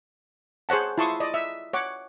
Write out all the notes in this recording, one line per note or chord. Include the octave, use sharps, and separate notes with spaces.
G#4 C5 C#5 F#5 A5
E4 F4 A5 C6 C#6 D#6
D5 D#5
E5
C#5 F#5 D6